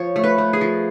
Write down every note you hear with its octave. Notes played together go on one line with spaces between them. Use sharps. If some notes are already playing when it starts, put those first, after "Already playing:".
Already playing: F3 C#5
A3
B4
A3
G#4
F3